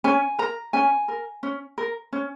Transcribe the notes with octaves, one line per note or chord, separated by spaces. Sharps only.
C#4 G#5
A#4 A#5
C#4 G#5
A#4
C#4
A#4
C#4